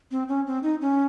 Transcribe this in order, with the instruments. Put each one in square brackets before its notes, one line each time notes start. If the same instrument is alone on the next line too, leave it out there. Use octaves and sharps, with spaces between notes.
[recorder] C4
C#4
C4
D#4
C#4